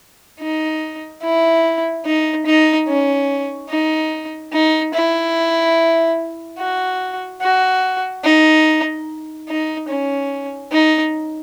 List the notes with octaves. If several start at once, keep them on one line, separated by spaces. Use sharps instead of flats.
D#4
E4
D#4
D#4
C#4
D#4
D#4
E4
F#4
F#4
D#4
D#4
C#4
D#4